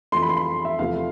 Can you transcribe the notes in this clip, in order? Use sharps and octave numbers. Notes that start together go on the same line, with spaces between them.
F2 E3 A3 C6
B5
C6
B5
E5
E2 C3 F3 A3 F5